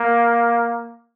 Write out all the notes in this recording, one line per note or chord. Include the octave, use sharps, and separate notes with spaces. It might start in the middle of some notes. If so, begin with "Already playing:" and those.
Already playing: A#3